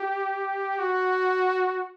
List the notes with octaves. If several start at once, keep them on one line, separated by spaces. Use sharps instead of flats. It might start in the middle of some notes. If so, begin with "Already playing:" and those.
Already playing: G4
F#4